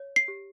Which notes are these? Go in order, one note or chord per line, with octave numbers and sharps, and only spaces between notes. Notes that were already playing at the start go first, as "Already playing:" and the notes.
Already playing: C#5
C7
G4